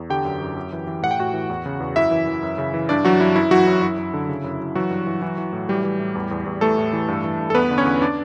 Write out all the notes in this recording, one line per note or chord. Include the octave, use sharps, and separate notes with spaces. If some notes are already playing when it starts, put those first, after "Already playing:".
Already playing: E2
D3 G4 G5
F#2
F#2
F#2
E3
E3
A2 F#5
G5
A2 F#4 F#5
E3
E2
C#3
E2
F#2 E4 E5
E3
E3
F#2
C#3
E3
G2 D4 D5
E3 F#3 F#4
G2 E4
F#2 E4
E3 F#3 F#4
F#2 E4
F#2 E4
F#2
D3
C#3
F#2
F#2
E3 F#3 F#4
G2
E3
E3
E3
A2
E3 G3 G4
E3
A2
E2
E2
E2
E3 A3 A4
A2
E3
G2
E3
G2
A4
E2 B3 B4
D3
C#4 C#5
E2
D4 D5